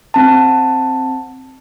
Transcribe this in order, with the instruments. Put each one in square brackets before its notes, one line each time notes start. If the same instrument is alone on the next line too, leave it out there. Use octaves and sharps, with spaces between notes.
[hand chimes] C4 A5